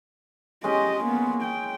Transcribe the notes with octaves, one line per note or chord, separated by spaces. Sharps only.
G#3 C#4 G4 D#5
A#3 B3
G5